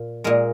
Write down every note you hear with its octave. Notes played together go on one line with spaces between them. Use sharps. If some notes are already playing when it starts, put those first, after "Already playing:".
Already playing: A#2
A#2 G#3 A#4